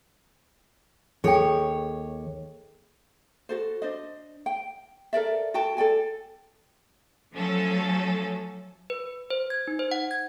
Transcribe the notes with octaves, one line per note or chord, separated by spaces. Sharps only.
D#2 G#4 A4 C#5 G5
F#4 A4 C5
D4 C5 D#5
G5
A4 A#4 D5 E5
F#4 A4 G5 A5
A4 D5 G5 G#5
F3 F#3 A3 C#4 A4
B4
C5
G#6
D#4
C5
F#5
G#6